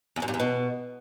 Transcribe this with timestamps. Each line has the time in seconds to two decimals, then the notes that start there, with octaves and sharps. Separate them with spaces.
0.16 E2
0.22 F#2
0.28 G2
0.34 E2
0.40 B2